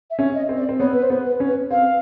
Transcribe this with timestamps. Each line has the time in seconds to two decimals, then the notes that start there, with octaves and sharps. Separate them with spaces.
0.10 E5
0.19 C#4
0.34 D#5
0.49 C4
0.57 D5
0.69 C4
0.80 B3 C#5
0.93 B4
1.02 C5
1.10 B3
1.25 B4
1.40 C#4
1.47 B4
1.71 C4 F5